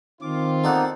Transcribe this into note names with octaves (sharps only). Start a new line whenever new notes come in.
D#3 C4 F4 D6
A#3 B3 D#4 A4 D5 F#5